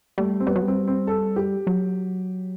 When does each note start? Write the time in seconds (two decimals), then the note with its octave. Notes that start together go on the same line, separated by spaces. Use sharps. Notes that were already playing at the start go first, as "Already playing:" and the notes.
0.18 G3 A3
0.40 C4
0.47 G3 B3
0.56 F#3
0.62 G3
0.68 C4
0.88 C4
1.07 A4
1.36 G4
1.67 F#3